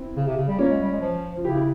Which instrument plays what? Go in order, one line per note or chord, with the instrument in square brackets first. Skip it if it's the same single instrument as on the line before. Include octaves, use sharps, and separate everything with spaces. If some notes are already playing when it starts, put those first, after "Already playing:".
Already playing: [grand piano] C4 E4
[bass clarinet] C#3
C3
C#3
G3
[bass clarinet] A#3 [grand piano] C#4 F4
[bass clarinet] G#3
G3
G#3
F3
[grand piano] F4
[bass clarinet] C#3 [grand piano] E4 G4
[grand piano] E4 G4